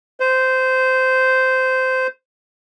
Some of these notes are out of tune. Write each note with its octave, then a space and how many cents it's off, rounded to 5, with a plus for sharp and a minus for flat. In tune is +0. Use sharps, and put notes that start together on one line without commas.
C5 -15